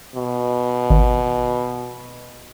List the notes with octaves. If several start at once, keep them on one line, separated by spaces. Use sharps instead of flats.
B2
G#1